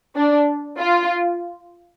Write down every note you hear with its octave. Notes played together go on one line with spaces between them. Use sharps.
D4
F4